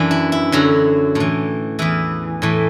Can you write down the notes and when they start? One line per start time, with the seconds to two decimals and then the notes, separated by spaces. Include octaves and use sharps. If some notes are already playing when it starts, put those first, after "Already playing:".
Already playing: F#2 E3 D4
0.11 E4
0.32 E4
0.52 F#2 D3 F#3 F#4
1.15 A2 E3
1.79 E2 E3 E4
2.42 A2 E3